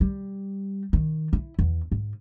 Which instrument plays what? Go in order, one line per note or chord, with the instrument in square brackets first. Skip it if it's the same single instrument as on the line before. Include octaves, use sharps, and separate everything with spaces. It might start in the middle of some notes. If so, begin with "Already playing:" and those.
[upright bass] G3
D#3
E4
E2
G#2